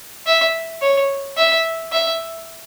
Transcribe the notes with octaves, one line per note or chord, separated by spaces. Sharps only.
E5
C#5
E5
E5